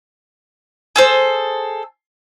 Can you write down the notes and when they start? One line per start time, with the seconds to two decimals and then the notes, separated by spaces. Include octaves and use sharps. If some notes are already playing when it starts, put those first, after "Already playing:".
0.96 G#4 A4 C5